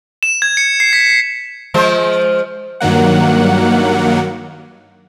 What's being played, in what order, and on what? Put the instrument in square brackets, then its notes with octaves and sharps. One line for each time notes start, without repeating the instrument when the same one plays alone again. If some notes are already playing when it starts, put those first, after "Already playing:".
[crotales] E7
G#6
C#7
C7
B6
[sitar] F3 G#3 C5
[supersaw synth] G2 D#3 F#3 A#3 F#5